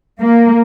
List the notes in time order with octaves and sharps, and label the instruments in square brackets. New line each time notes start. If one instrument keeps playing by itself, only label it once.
[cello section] A#3